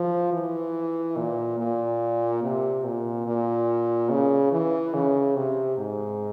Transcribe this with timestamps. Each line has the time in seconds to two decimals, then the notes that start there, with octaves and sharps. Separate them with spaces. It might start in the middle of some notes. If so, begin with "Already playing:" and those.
Already playing: F3
0.33 E3
1.17 A#2
1.59 A#2
2.43 C3
2.85 A#2
3.26 A#2
4.10 C#3
4.52 E3
4.94 C#3
5.36 C3
5.78 G#2